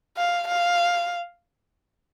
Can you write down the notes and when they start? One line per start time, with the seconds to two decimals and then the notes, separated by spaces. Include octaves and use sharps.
0.17 F5
0.48 F5